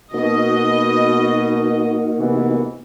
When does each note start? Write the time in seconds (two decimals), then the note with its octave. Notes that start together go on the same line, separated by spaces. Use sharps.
0.14 B2 A#3 D#4 F#4 D#5
2.19 C3 E3 B3